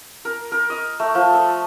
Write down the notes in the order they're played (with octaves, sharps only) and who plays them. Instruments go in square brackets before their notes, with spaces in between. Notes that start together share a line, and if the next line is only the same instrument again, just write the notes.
[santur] A#4
A#4
D#5
A3
F3
A4